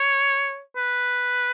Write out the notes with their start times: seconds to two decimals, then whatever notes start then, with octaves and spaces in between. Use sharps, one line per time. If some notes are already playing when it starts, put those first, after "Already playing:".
Already playing: C#5
0.76 B4